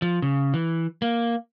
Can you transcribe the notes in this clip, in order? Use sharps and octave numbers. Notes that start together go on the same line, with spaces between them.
F3
C#3
E3
A#3